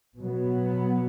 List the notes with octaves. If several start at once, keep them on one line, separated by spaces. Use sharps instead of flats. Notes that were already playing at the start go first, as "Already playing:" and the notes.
B2 F#3 B3